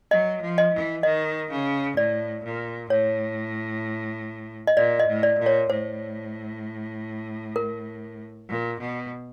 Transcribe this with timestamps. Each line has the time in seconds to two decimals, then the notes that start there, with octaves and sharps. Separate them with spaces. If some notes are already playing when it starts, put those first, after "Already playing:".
0.11 F#3 D#5
0.42 F3
0.58 D#5
0.73 E3
1.03 D#3 D#5
1.50 C#3
1.97 A2 D5
2.44 A#2
2.90 A2 C#5
4.67 D#5
4.77 A#2 D5
4.99 D#5
5.08 A2
5.23 D5
5.39 A#2
5.46 C#5
5.70 A2 C5
7.56 A#4
8.49 A#2
8.80 B2